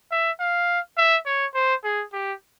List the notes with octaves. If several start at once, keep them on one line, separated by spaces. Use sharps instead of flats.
E5
F5
E5
C#5
C5
G#4
G4